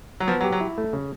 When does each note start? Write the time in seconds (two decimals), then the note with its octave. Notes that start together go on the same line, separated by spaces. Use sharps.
0.20 F#3
0.28 F3 B3
0.40 F#3
0.44 G4
0.52 F#3
0.61 E4
0.78 A3
0.93 C#3